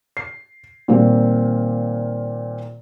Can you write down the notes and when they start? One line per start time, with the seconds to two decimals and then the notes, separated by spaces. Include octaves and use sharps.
0.17 C7
0.88 A#2 D#3 G3 A#3 C4